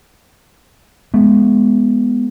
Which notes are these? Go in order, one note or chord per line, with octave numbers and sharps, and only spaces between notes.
G#3 B3